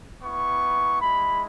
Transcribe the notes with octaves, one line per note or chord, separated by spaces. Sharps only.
B3 E4 C#6
G#3 E4 B5